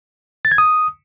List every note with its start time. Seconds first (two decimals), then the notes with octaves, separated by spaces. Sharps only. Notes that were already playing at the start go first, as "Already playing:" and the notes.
0.45 A6
0.52 G#6
0.58 D#6